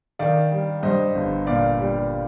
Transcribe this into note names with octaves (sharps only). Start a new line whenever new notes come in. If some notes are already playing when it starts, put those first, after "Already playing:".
D#3 D5 F5
G3
G2 C5 D#5
G1
A#2 D5 F5
G3